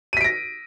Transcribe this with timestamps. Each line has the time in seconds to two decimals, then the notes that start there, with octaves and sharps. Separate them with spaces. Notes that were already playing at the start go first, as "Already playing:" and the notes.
0.13 D#7
0.17 B6
0.21 D7
0.24 A#6